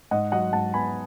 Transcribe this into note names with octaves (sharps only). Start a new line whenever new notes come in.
G#2 D#5 F#5
F#3 D#5 F#5
G#2 F#5 A5
B3 G#5 B5